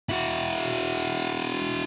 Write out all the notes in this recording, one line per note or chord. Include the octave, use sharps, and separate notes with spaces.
E4 F#4